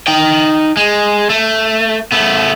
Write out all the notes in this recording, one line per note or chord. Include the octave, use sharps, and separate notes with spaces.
D#4 G5
G#3
A3
A3 B3